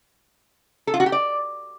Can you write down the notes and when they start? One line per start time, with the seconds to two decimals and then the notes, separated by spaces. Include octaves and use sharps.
0.87 A4
0.94 F4
1.00 F#4
1.06 G4
1.12 D5